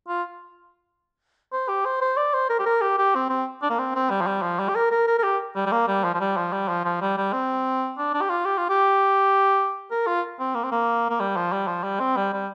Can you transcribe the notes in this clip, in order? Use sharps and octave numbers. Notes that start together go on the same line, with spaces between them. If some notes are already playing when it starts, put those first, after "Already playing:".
F4
C5
G4
C5
C5
D5
C5
A#4
G4
A#4
G4
G4
C4
C4
D4
A#3
C4
C4
G3
F3
G3
F3
G3
G4
A#4
A#4
A#4
A#4
G4
G3
G3
A#3
G3
F3
F3
G3
F3
G3
F3
F3
G3
G3
C4
D4
D4
G4
F4
G4
F4
G4
A#4
F4
C4
A#3
C4
A#3
A#3
G3
F3
G3
F3
G3
C4
G3
G3